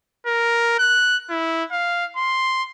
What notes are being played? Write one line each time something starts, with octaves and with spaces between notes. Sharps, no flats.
A#4
F#6
E4
F5
C6